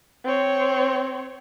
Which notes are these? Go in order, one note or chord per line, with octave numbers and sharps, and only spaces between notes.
C4 C#5